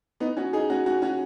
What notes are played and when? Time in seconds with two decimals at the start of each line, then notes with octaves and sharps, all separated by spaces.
0.20 B3 D#4
0.37 C#4 F#4
0.53 D#4 G#4
0.70 C#4 F#4
0.86 C#4 F#4
1.02 C#4 F#4